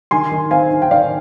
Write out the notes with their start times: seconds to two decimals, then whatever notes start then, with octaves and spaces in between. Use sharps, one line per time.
0.11 D#3 G#5 C6
0.32 D#3
0.51 C4 F5 G#5
0.71 D#3
0.82 G5
0.91 D#3 D5 F5